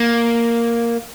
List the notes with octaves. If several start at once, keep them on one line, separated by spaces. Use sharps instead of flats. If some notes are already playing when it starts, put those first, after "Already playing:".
Already playing: A#3